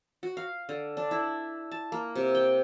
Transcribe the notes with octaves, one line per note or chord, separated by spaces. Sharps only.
F#4
F5
D3
D4
E4
A5
A#3
C3
G5